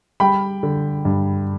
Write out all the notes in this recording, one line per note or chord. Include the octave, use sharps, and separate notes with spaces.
G3 G5 B5
D3
G2